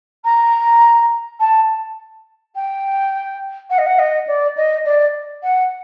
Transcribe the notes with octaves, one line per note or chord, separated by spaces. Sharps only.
A#5
A5
G5
F#5
D#5
F#5
D#5
D5
D#5
D5
F#5